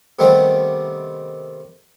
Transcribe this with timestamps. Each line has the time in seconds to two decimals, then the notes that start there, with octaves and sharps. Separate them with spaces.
0.19 C3 D#3 G3 A3 B3 C4